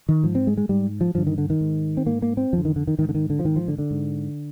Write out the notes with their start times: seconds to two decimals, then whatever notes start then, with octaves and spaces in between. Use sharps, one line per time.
0.09 D#3
0.24 G#2 F3
0.35 C4
0.47 G#3
0.57 G#3
0.69 G#2 G3
1.01 F3
1.15 G2 D3 F3
1.27 D#3
1.38 D3
1.50 D#3
1.61 G#2
1.97 C4
2.06 G#2 A#3
2.22 A#3
2.37 C4
2.53 F2 D3 F3
2.65 D#3
2.76 D3
2.88 D#3
2.98 G#2 D#3
3.09 D3
3.15 D#3
3.30 D3
3.39 F3
3.44 G#2 D#3
3.56 F3
3.68 D3
3.78 D3
3.91 G#2